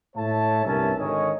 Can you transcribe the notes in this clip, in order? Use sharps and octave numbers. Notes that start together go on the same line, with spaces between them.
A2 A3 C#5 E5 A5
C2 G2 C#4 A#4 E5 A5
G#1 D3 D#3 C#5 D#5 G#5